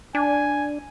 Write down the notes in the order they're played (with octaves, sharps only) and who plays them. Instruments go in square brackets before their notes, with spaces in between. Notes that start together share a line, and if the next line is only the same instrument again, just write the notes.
[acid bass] D4 [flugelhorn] G#5